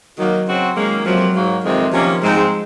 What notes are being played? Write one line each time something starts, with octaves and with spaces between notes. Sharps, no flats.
D#3 F#3 A#3 D#4 F#4
C#3 F#3 C4 F#4
F#2 D#3 G#3 A#3 C#4
F2 C3 F3 F#3 A#3
G#2 F#3 A#3
F2 C3 D#3 G#3
C3 D#3 F3 A#3 C#4
G#2 F3 G#3 C4 D#4